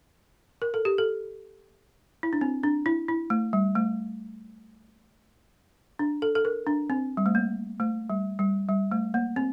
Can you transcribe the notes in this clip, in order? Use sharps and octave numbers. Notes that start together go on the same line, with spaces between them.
A#4
A4
G4
A4
E4
D4
C4
D4
E4
E4
A3
G3
A3
D4
A4
A4
A#4
D4
C4
G3
A3
A#3
A3
G3
G3
G3
A3
A#3
C4